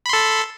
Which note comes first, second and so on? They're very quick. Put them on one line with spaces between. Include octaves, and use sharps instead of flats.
B5 C6 A4